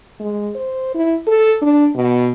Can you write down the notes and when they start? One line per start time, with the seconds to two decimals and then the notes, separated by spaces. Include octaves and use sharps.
0.20 G#3
0.55 C5
0.95 E4
1.27 A4
1.62 D4
1.96 B2